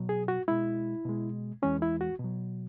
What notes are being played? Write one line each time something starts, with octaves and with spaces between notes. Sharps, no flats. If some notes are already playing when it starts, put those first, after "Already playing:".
Already playing: B2 F#3
G#4
F#4
B2 G#3 E4
B2 G#3
E2 E3 G#3 C#4
E4
F#4
B2 F#3